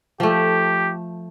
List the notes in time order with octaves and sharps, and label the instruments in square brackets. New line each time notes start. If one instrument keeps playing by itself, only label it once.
[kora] F3 A3 [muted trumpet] G4